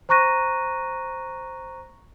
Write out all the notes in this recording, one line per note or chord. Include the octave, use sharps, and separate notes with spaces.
C5 A#5 C#6 F#6 A#6 D#7